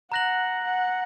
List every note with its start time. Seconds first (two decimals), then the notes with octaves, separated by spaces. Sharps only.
0.12 F#5 A#5 F#6 A#6 F#7
0.64 F#5